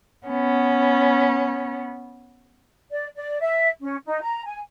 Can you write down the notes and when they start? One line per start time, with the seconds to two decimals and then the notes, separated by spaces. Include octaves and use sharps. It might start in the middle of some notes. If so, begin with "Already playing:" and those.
0.25 B3 C#4
2.91 D5
3.15 D5
3.40 E5
3.80 C#4
4.05 D#4
4.21 A#5
4.44 G#5